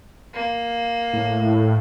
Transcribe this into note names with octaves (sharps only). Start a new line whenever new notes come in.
A#3
A2